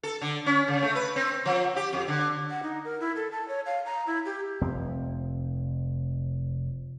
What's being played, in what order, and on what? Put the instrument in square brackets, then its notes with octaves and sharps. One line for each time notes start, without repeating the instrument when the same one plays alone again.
[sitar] A4
D3
C#4
C#3
A3
B4
C4
F3
G4
F2
D3
[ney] F#5
D#4
A#4
E4
A4
A5
C#5
F5
A#5
E4
G4
[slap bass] F1 F3 C4